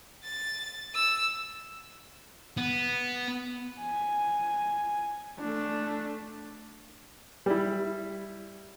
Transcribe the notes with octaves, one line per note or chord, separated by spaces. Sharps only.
A6
E6
B3
G#5
A3 D4
G3 E4